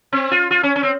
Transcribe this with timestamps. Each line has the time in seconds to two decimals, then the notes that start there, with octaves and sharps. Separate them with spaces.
0.13 C4
0.31 F4
0.51 F4
0.63 C#4
0.76 C#4
0.83 C4